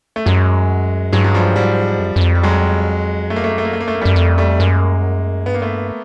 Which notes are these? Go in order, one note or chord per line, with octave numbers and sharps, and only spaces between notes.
A3
F#2 F#3 G#3
G2 F#3 G#3
F#3
F3 G3
G#2 F3 G3
F#2
F#2
F2
G3
F#3 G#3
F#2 A3
F2 A#3
F#2 A3
A#3
A3
A#3
A3
A#3
A3
A#3
F#2 G3 A3
F2 G3 A3
G3 A3
F#2 G#3 A#3
G2 B3
A#3
A3 B3